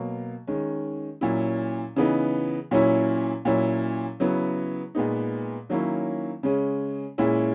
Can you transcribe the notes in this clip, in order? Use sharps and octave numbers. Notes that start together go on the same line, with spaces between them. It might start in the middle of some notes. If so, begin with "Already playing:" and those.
Already playing: B2 F#3 A#3
D#3 G#3 C#4
A#2 F#3 C#4 E4
C#3 E3 B3 D#4
A#2 F#3 C#4 E4
A#2 F#3 C#4 E4
C#3 F#3 B3 E4
A#2 G#3 B3 D#4
D#3 F#3 A#3 C#4 E4
C#3 G#3 C#4
A#2 G#3 C#4 E4